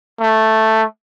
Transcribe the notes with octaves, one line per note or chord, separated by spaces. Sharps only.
A3